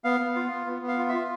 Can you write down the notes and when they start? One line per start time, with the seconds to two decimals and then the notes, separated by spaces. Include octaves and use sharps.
0.04 B3 F5
0.20 B3
0.36 F4
0.51 B3
0.67 B3
0.82 B3
0.88 F5
0.98 F4
1.09 E5
1.14 F4